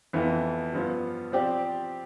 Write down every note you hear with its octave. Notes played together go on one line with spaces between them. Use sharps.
F2 E3 B3
G2 F3 B3
F3 C4 G4 D5